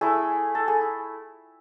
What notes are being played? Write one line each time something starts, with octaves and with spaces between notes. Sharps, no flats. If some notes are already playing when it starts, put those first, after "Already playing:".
A3 E4 G#4
A4
G#4